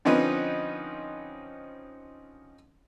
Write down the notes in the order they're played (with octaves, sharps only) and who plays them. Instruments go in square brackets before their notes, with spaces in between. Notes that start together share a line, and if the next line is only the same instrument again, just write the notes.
[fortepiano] D3 F3 C4 C#4 D#4 B4